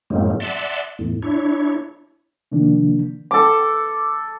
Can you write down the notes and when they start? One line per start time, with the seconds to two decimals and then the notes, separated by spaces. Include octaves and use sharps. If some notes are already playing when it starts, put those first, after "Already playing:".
0.10 F#2 A2 F#3 G#3 A#3 C4
0.40 D5 E5 F#5 A5 C6
0.99 E2 A2
1.22 D4 E4 C#5
2.52 C3 D#3 F3 A#3 D4
3.31 A4 D6